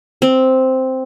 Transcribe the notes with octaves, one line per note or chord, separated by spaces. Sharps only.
C4